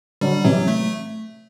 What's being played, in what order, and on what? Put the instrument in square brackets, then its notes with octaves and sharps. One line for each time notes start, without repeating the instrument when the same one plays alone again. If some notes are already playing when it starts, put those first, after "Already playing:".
[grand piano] D3 F#3 [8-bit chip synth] G3
[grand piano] C3 E3 [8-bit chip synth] F#3
[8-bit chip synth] A3